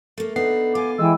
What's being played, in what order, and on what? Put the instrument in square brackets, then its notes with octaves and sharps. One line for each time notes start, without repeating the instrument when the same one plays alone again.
[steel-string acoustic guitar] A3 A#3
[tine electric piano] B3 C7 [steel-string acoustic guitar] D4 D#4 A4
[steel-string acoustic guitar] F4 [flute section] G#5 D6
[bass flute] E3 [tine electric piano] G#3 [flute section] G5 G#5 E6